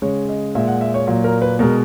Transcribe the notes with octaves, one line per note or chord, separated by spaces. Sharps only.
C#3 G#3 C#5
D#5
A#2 G#3 E5
F#5
E5
C#5
A#2 F#3
A#4
B4
B2 G#3 A#4